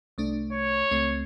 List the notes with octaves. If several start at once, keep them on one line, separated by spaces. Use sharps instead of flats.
C2 A3 D4
C#5
C#2 A3 C4